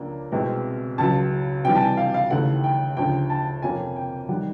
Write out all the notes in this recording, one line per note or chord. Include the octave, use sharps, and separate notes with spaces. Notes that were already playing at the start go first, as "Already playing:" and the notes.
Already playing: C#2 C#3 F3 A#3 D4
C2 B2 G#3 C4
C#2 C#3 F#3 A5
C3 E3 G3 G5
A5
G#5
F5
F5
D#2 C#3 E3 A3 F#5
G5
D2 C#3 F3 G5
A5
F2 C3 F3 A#3 C#4 G#5
G5
D#3 G3 F#5